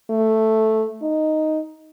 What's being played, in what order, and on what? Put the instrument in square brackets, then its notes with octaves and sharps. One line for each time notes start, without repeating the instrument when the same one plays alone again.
[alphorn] A3
D#4